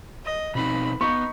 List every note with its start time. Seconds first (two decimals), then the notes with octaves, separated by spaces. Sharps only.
0.25 D#5
0.55 B2 C4 D#4 B5
1.01 B3 D#4 C#6